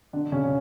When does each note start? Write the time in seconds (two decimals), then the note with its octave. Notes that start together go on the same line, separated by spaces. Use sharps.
0.13 D3 D4
0.32 C#3 C#4